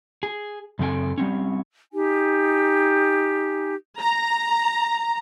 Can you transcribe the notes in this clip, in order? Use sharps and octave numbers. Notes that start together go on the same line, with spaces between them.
G#4
F#2 C#3 C4 A4 G5 G#5
G3 C4 C#4
D#4 G4 G#5
A#5